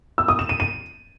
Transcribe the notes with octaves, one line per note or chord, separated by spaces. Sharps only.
E6
D#6
E7
D#7
D#7